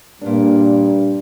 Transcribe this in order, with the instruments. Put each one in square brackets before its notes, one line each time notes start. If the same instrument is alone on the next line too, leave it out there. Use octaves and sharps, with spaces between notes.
[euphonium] G2 [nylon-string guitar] A#2 D4